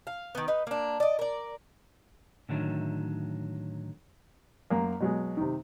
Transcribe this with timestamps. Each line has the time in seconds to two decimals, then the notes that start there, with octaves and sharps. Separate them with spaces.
0.07 F5
0.35 D#3 B3
0.48 D#4 B4
0.67 A#3 D4
1.00 D5 D#5
1.19 A#4 D5
2.49 A2 D3 D#3 F#3
4.70 F#2 A#3
5.00 B2 F#3 G#3
5.37 C3 D#3